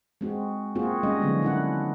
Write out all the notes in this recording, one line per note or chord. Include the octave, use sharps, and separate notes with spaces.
G#3 C4 F#4
A#3 C4 F4 F#4 G#4
G3 G#3 C#4 D#5
D3 D#3 F3 F#3 G#3 B3
D4 E4 F#5